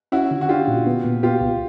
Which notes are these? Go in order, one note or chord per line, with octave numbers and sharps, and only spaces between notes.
C#4 E4 F#4
D3
F#4
D4 F4 G4
A#2
B3
A#2
B3 F4 G4
C2